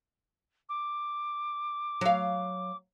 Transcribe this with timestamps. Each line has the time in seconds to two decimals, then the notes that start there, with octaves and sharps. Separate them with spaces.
0.69 D6
2.01 F#3 F5